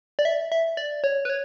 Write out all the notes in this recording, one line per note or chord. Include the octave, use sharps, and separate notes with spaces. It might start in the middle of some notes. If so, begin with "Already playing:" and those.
D5
E5
E5
D5
C#5
B4
C#5